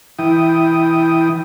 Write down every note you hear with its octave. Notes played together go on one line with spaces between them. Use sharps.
E3 E4 G5 D#6